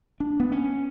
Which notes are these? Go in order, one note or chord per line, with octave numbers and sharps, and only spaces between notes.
D4
B3
C#4